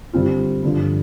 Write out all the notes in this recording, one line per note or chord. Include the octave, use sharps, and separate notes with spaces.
D3 G3 C4 F4
G2 D3 F3